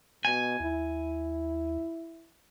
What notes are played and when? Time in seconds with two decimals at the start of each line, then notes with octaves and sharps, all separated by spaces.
0.25 B2 G#5
0.60 D#2 E4